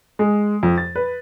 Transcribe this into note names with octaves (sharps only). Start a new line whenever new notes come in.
G#3
F2
A6
B4